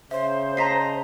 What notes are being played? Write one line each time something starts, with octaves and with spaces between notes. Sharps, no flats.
C#3 C5 E5
D#5 A5 A#5 B6 C7